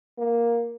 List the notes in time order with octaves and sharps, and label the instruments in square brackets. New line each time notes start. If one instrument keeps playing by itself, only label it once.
[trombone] A#3